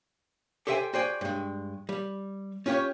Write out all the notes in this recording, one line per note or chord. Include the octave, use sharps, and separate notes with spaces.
G4 A4 C5 E5 G5 G#5
F#4 G#4 C5 D5 G5 G#5
G2 G#3
G3
C#4 F4 G4 C5 C#5